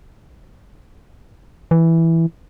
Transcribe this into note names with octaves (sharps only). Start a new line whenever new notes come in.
E3